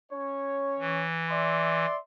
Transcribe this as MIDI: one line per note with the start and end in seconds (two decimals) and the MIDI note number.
0.11 1.04 61
0.11 1.04 73
0.79 1.86 52
1.30 1.99 74
1.30 1.99 76
1.30 1.99 84